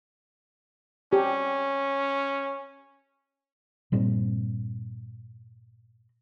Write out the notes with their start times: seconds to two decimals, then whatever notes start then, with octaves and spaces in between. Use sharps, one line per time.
1.13 C#4 G4
3.92 G2 A#2 G3 C4